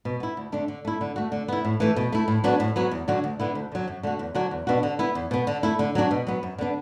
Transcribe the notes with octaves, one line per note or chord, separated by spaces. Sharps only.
B2
B3 E4
D2
D3 A3 D4
D3
A3 E4
D3
A3 F#4
D3
B3 E4
A2
E3 A3
B2
A3 E4
A2
F#3 B3 D4 F#4
A2
F#3 B3 F#4
E2
D3 F#3 D4 F#4
D2
D3 B3 E4
D2
D3 F#3
F#2
D3 A3 F#4
E2
D3 F#3 D4 F#4
E2
B2 B3 D4 F#4
D3
B3 E4
E2
B2 B3
D3
A3 E4
D3
F#3 A3 D4 F#4
B2
F#3 B3
F#2
D3 B3 D4